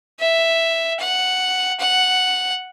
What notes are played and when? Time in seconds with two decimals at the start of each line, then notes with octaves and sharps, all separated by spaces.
0.20 E5
1.00 F#5
1.80 F#5